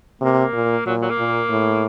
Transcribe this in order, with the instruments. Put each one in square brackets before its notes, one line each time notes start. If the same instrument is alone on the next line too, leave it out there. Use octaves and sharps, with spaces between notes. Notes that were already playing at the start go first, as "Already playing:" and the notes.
[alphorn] C3 [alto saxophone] A#3
[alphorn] A#2
[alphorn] A#2 [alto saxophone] F#3
[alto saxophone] F#3
A#3
[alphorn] A#2
A2